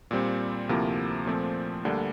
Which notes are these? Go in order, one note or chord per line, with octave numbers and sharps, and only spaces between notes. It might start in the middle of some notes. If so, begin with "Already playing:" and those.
A#2 G3 C4
D2 C3 F3 A#3 E4
A#2 F3 A3 C4
D2 D3 G3 A#3 D4